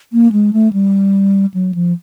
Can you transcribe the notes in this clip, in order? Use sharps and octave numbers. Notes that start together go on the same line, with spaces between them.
A#3
G#3
A3
G3
F#3
F3